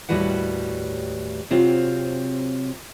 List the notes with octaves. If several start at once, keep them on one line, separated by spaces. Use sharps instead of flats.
D#2 A2 G3 F#4 B4 F#5
C3 F#3 C4 F4